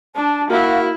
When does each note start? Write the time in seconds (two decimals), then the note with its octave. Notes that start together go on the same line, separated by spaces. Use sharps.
0.16 D4 A5
0.50 A#3 E4 F#4 F5